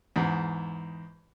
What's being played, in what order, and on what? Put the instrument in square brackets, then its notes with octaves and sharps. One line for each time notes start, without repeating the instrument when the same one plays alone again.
[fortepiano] E2 G#2